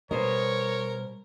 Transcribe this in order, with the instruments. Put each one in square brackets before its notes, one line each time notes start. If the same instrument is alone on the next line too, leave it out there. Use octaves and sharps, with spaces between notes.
[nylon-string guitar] B2 C5 D#5 [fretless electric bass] G3 [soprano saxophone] A#4 [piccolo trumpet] C#5